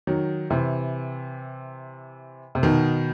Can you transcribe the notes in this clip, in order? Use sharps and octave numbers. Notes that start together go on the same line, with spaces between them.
D#3 F#3
C3 E3
C3
B2 D#3